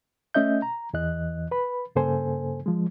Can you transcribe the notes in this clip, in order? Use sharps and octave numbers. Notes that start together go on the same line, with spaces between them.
A3 C#4 D#5 E5 G6
A#5
E2 E3 D#5 F#6
B4 B5
G2 C#3 A#3 A4 C5 G#5
F3 G#3